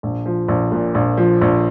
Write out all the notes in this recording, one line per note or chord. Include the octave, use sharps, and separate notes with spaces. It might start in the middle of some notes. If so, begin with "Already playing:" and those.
A#1
F3
A#1
A#2
A#1
F3
A#1